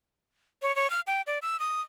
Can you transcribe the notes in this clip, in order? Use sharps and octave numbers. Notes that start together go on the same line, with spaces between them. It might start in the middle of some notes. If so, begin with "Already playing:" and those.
C#5
C#5
F6
G5
D5
E6
D#6